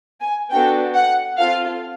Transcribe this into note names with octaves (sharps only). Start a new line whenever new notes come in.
G#5
B3 D4 F#4 A4 G5
F#5
C4 F4 A4 F5